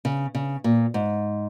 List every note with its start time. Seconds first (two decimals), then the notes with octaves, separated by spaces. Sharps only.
0.05 C#3
0.35 C#3
0.64 A#2
0.94 G#2